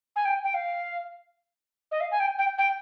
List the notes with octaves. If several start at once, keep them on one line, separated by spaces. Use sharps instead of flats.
G#5
G5
G5
F5
D#5
F5
G#5
G5
G5
G5